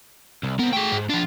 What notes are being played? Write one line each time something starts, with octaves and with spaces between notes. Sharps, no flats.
C2
B3 C4 A#4
A3 G#4 G5
G#2
F3 D4 F4